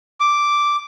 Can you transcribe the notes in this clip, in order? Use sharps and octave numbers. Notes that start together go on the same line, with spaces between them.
D6